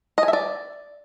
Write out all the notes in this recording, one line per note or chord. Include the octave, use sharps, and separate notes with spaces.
D#5
G#5
E5
D5